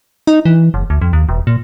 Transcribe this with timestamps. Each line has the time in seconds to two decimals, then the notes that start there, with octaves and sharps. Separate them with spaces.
0.27 D#4
0.45 E3
0.74 F#1
0.90 D2
1.02 F2
1.13 D#2
1.29 E1
1.47 A#2